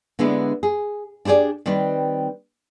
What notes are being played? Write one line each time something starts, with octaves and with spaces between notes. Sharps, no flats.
D3 G#3 B3 D4 E4
G#4
D4 E4 G4 G#4 D5
D#3 G3 C4 G4 B4